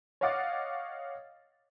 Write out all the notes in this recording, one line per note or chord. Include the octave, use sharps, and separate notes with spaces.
C#5 D#5 F5 F#5 D6 A6